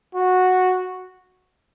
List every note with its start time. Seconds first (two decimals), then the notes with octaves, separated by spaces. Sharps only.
0.15 F#4